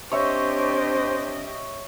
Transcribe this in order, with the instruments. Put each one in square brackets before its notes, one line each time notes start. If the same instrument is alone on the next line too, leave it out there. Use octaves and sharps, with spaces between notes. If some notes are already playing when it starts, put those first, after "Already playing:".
[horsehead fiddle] C4 D4 [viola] G4 D#5 [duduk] C5 [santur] C#5 E5 C#6